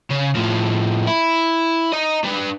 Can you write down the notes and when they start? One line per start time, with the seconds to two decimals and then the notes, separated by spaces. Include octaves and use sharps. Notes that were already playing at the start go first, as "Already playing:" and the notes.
0.10 C#3
0.35 A2 F3
1.07 E4
1.93 D#5 A#5
2.24 D4 B4